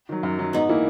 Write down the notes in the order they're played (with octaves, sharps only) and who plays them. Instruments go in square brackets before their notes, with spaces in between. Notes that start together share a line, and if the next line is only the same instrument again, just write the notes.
[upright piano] D#3 F#3
F#2
D#3 F#3
[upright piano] G#2 [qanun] B3 D#4
[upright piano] E3 A#3 E4